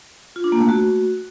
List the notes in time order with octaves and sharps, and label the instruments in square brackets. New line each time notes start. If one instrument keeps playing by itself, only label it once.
[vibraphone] F4
D4
A#3
A3
F#4